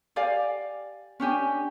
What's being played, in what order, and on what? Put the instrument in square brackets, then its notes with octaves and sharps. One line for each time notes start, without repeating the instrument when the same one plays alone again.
[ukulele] G4 D5 F5 G#5
C#4 D4 G4 G#5